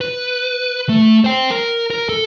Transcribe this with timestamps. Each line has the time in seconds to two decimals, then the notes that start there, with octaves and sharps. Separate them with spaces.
0.01 B4
0.89 A3
1.24 C5 G5
1.51 A#4
1.90 A#4
2.09 A4